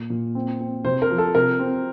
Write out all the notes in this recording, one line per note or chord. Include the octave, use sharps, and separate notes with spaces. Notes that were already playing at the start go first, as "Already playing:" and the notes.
Already playing: A#2
A#2
C4
C4
C3 C5
A#4
F3
A4
C3 A#4
C4